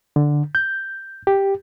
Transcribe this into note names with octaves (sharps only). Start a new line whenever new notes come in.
D3
G6
G4